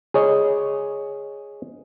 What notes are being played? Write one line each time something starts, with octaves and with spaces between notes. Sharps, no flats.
G#4 C#5 D#5